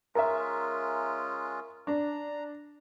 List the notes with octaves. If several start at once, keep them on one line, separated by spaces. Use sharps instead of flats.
G#3 C#4 F4 A#4 E5
D4 A#5